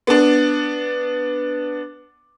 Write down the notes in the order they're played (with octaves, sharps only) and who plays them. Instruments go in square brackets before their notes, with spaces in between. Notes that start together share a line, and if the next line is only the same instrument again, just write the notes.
[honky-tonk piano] B3 D4